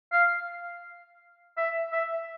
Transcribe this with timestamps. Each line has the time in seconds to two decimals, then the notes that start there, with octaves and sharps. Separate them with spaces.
0.12 F5
1.57 E5
1.92 E5